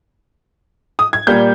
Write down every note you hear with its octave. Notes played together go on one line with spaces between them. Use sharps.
D#6
G#6
A#2 G3 A#3 G6